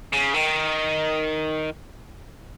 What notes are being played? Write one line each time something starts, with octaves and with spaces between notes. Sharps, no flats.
C#3
D#3